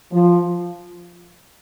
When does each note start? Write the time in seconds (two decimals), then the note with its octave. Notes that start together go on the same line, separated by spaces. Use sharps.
0.12 F3